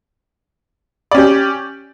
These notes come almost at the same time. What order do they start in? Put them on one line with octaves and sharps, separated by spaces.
D5 C#4 G4